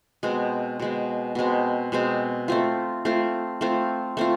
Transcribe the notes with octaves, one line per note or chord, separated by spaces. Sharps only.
B2 G#3 C4
B2 G#3 C4
B2 G#3 C4
B2 G#3 C4
A3 C4 F4
A3 C4 F4
A3 C4 F4
A3 C4 F4